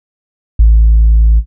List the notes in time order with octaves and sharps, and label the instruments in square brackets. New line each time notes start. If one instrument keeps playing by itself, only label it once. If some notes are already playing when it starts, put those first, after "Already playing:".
[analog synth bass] A1